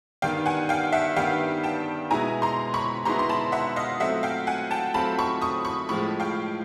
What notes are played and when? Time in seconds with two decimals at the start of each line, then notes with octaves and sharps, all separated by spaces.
0.22 G2 D#3 G3 B3 D4 F5 G5
0.46 F#5 G#5
0.69 F5 G5
0.93 E5 F#5
1.16 G2 D#3 G3 B3 D4 F5 G5
1.64 G5 A5
2.11 B2 G#3 B3 E4 G#4 G#5 A#5
2.42 A#5 C6
2.74 B5 C#6
3.05 B2 G#3 B3 E4 G#4 A#5 C6
3.19 C6
3.29 A5 B5
3.52 E5 F#5
3.76 D#5 F5
4.00 F#3 A3 C4 F4 E5 F#5
4.23 F5 G5
4.47 F#5 G#5
4.71 G5 A5
4.94 F#3 A3 C4 F4 A5 B5
5.19 B5 C#6
5.42 C#6 D#6
5.65 B5 C#6
5.89 A2 F3 G#3 B5 C#6
6.20 F5 G5